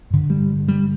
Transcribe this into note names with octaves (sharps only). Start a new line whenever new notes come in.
G2 D3
G3
G3